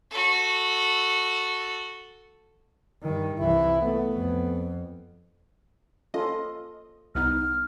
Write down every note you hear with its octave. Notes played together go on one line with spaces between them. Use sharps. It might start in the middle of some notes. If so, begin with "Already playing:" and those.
F#4 A4
G2 D#3
C2 E3 E4
A3 B3
F2
C#4 F4 A4 D#5
C2 B3 D#4 F6